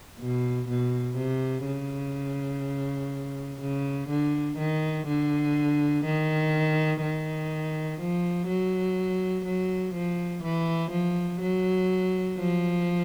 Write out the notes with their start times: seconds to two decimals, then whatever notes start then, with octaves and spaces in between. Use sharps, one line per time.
0.20 B2
0.69 B2
1.17 C3
1.66 C#3
3.61 C#3
4.09 D3
4.58 D#3
5.07 D3
6.05 D#3
7.02 D#3
8.00 F3
8.48 F#3
9.45 F#3
9.94 F3
10.43 E3
10.91 F3
11.41 F#3
12.38 F3